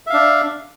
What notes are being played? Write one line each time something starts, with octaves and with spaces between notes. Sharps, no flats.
D4 E5 F5